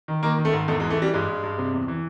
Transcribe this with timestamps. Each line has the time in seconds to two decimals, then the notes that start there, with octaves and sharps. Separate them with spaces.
0.08 D#3
0.23 D#3 A#3
0.38 D#3
0.45 A3
0.53 G#2
0.68 E2 A3
0.80 G#3
0.83 E3
0.90 A3
0.98 E3 G3
1.14 G2 G#3
1.28 G2
1.43 G2
1.58 C3
1.73 E2
1.88 E3